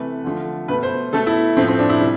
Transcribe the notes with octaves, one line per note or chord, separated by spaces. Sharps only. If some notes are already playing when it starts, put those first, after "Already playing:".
Already playing: C3 E3 A3 B4
D3 F3 A3
B2 A3 B4
C5
B2 A3 A4
E4
A2 F3 A3 C4
C4
D4
E4
C3 G3